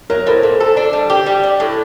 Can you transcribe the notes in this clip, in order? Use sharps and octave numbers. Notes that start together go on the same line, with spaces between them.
F#3 A#4
A2 C5
A#2 C5
A4
D4
G3
G4
G3
D4
A2